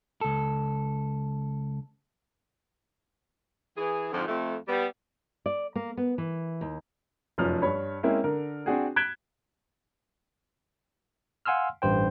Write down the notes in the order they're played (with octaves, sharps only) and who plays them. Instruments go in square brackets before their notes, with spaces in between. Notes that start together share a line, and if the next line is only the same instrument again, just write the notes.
[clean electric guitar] C#2 A4
[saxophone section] E3 G#4
F2 G#2 D3 F3
F2 A3
G3 B3
[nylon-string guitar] D5
A#3
B3
E3
D#2
[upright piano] F1 F#2 F3 C#4 F6
G2 C#5 B5
G#3 A#3 C4 C#4 E4
D3 A#4
C4 D4 F#4 G#4
F#6 G#6 B6 D7 E7 G7
[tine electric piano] F5 F#5 G#5 C6 E6 F6
A1 G2 C5 G5